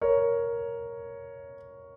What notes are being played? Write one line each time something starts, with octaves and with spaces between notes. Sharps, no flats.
A#4 C#5